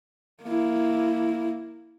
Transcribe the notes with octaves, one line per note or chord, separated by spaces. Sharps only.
A#3 E4